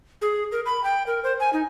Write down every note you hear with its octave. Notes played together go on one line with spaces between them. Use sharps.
G#4
A#4
B5
G5
A#4
C5
G#5
D#4